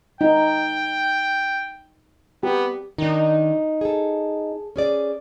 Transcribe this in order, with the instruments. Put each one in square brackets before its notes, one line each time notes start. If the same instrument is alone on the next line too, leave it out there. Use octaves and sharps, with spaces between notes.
[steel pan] D#4 [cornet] G5
[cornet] B3 [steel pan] G4
[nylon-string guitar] D#3 D4 [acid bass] D#4
[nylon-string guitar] G#4 A4
C#4 G#4 D5